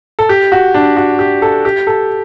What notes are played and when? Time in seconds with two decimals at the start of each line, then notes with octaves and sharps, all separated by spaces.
0.19 A4
0.29 G4
0.52 F#4
0.74 D4
0.97 F#4
1.19 G4
1.42 A4
1.65 G4
1.87 A4